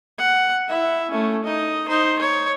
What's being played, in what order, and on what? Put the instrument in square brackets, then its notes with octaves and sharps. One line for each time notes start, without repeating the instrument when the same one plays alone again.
[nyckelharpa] F#5
E4 E5
A3 C#4
D#4 D#5
D#4 C5
C#5